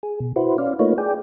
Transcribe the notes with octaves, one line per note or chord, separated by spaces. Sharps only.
G#4
B2
E4 F#4 B4 C5
C#4 D5 F5
A3 A#3 D#4 F4 B4 C#5
G#4 D5 G5